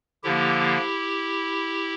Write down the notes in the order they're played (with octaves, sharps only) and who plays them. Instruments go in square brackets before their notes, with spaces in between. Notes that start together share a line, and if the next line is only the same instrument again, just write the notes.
[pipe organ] D3 F3 A#3 E4 G4